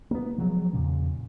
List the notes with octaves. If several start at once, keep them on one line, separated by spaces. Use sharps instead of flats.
A#3 B3
F3 F#3 G#3
E2 A#2 C#3